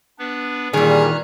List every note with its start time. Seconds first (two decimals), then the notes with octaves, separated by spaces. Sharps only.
0.19 B3 D4 B4
0.73 A#2 D#3 E3 G3 G#4 A#5 F6 F#6